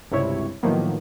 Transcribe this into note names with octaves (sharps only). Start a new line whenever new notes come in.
C#2 G2 C3 E4 C#5
A2 D#3 F3 F#3 A#3 B3